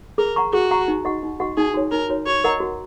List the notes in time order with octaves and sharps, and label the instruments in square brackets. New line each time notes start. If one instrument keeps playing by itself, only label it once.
[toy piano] G#4 [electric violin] A#4
[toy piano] F#5 A#5 C#6
[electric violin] F#4 [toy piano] G#4
[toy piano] F#5 A#5 C#6
D#4
F#4 D#5 F#5 C#6
D#4
F#4 D#5 F#5 C#6
[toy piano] D#4 [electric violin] G#4
[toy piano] F#4 C#5
[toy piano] D#4 [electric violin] A#4
[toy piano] F#4 C#5
[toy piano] F#4 [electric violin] C#5
[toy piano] A#4 D#5 F#5 A#5
F#4